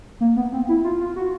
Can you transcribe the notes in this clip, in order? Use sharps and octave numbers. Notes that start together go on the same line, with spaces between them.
A#3
B3
C4
E4
F4
F4
F#4